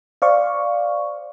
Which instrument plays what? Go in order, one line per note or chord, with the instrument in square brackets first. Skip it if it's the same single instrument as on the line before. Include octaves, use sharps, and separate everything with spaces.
[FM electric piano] C5 D5 F5 C#6